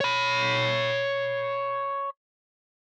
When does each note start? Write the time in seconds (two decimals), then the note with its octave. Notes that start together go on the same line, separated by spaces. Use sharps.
0.01 C#5 B5